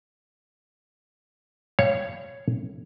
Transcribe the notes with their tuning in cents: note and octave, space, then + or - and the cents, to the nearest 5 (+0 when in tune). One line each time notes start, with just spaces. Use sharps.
C#5 +0 F5 -20